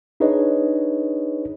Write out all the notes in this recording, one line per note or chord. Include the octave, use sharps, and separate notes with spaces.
D4 D#4 G#4 B4 C#5 D#5